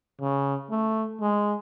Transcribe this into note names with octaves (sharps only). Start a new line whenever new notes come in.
C#3
A3
G#3